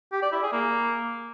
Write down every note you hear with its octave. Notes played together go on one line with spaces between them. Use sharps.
G4
D5
E4
G#4
A#3